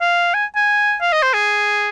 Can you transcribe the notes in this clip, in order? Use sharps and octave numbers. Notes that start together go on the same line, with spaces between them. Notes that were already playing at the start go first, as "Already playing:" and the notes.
F5
G#5
G#5
F5
D#5
C5
G#4